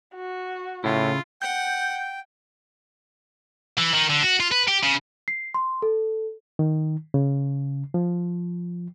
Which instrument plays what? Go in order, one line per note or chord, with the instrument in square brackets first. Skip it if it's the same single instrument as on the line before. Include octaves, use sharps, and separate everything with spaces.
[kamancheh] F#4
[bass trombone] A2 [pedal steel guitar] C#3 E4 [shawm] F4
[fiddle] F#5 [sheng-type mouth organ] G5 [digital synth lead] G6
[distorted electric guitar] E3
D#3
D3
F#4
F4
B4
G4
C#3
[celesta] C7
C6
A4
[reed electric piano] D#3
C#3
F3